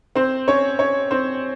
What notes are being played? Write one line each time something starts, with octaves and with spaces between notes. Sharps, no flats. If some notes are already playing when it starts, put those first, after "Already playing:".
C4 C5
C#4 C#5
C#4 C#5
C4 C5